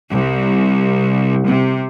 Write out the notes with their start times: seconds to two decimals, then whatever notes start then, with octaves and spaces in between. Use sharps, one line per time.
0.10 C2
1.45 C3